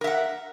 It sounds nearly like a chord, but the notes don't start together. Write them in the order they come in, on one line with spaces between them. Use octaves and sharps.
A#4 E5 F#5